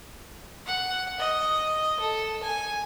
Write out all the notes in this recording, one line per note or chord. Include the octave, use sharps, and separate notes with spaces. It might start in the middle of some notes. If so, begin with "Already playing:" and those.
F#5
D#5
A4
G#5